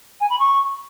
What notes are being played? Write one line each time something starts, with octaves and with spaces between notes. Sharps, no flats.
G#5
B5
C#6